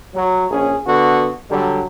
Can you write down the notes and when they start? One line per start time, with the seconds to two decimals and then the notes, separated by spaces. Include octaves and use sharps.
0.15 F#3
0.51 A#1 C#4 G#4
0.87 D3 B3 F#4
1.51 D3 F#3 G3